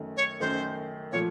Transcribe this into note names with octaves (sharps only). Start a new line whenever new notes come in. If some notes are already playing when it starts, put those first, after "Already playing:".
Already playing: F#2 D#3 A3
C#5
F#2 D#3 A3 C5
A#2 F3 A3 C#5